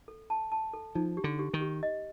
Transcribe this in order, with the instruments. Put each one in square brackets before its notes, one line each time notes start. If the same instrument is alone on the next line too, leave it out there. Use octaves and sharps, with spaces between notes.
[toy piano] A4
A5
A5
A4
[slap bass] F3 [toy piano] D#4
[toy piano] G4
[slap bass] D3
[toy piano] G4
[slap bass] D#3
[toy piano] G4
D#5